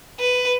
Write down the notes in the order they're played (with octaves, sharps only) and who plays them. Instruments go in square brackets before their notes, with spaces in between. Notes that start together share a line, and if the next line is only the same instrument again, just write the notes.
[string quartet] B4